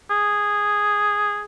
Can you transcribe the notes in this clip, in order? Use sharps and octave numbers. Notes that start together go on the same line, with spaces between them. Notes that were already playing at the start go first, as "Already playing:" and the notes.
G#4